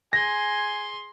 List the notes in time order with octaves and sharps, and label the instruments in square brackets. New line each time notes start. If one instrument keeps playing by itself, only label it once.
[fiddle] G#4 C6 [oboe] G#5 [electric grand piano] A#6